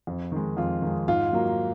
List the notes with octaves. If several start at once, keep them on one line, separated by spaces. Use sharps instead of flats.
F2
D#3 G#3
F2 F4
D#3 G#3
G#2 F4
F#3 A#3